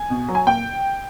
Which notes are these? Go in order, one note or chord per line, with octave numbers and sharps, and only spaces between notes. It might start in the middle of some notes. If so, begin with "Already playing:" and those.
Already playing: G#5
B2
F#3
G#5
A#2 G5